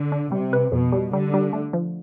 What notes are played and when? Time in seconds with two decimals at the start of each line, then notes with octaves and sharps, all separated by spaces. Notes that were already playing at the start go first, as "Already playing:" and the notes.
Already playing: D3
0.12 D4
0.32 C3 G3
0.53 B4
0.72 F2 B2
0.92 G3
1.13 D3 G3
1.34 G3
1.53 A3
1.73 F3